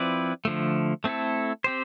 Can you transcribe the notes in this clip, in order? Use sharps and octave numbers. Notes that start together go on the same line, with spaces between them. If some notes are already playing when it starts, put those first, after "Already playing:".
Already playing: F3 C4 E4 B4 D5
D3 F3 A3
A3 C4 E4 A4
C4 G4 C5